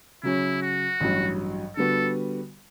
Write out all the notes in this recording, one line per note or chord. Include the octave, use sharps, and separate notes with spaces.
C#3 F#3 C#4 E4
F#4
A1 G2 F#3
D3 G3 B3 F#4 A4